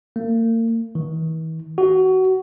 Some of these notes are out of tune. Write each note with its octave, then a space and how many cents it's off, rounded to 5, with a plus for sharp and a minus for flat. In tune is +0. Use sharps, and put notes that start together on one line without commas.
A#3 -40
E3 -45
F#4 +20